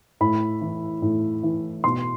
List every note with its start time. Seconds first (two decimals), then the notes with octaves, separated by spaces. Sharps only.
0.21 A2 B5
0.61 E3
1.02 A2
1.43 E3
1.84 B2 C6